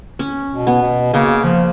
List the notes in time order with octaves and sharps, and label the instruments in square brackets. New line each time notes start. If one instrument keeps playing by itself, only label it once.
[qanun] C#4
[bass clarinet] B2
[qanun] B3
[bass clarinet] B2
[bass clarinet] C#3 [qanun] A#3
[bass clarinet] F3